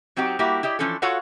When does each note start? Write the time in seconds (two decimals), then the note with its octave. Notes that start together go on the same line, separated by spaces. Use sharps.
0.16 F#3 C4 D#4 F#4 G4
0.39 G3 A#3 E4 F#4 G4
0.63 E4 G4 D5 D#5
0.79 E3 F3 C#4 D4 A4
1.02 F4 F#4 A4 C#5 F5 F#5